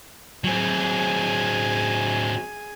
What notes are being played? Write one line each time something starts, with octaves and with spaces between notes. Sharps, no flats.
F#3 C4 G#4 G#5